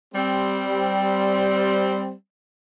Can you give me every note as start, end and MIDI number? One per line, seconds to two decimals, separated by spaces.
0.15 2.12 55
0.15 2.12 60